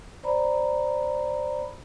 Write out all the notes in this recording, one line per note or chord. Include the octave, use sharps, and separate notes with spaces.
C5 D5 A#5 B5